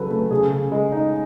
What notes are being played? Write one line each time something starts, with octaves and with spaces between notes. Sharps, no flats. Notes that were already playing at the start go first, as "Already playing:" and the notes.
Already playing: C#3 F#3 A4 B4
A3 B4
C#3 G#4
C#3
G#3
D#4